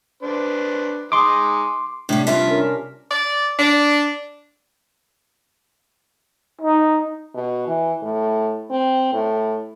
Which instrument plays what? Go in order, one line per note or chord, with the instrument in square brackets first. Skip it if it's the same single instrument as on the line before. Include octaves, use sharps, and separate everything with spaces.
[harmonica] D4 B4 C5
[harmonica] G#3 D#4 [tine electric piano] C6 D6
[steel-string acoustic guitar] A2 G3 [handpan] C3 D4
[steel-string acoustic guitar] G2 F4 E5
[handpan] C#4 D4 A#4
[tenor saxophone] D5
D4
[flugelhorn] D#4
[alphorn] B2
E3
A2
C4
A2